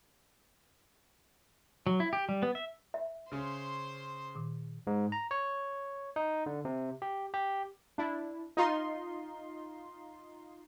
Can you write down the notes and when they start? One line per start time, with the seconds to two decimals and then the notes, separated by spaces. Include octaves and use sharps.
1.87 F#3
2.00 E4
2.13 G4
2.29 G3
2.43 B3
2.55 E5
2.94 E5
3.32 C#3 C#4 C5 C6
4.35 A#2 D#3 D6
4.87 G#2
5.12 A#5
5.31 C#5
6.16 D#4
6.46 D3
6.65 C3
7.02 G4
7.34 G4
7.98 D4 E4
8.57 D#4 F4 C6